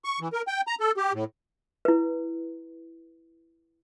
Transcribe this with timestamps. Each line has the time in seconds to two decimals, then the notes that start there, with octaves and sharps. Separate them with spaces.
0.04 C#6
0.20 E3
0.33 A#4
0.48 G5
0.67 A#5
0.80 A4
0.97 G4
1.14 A2
1.85 E4 B4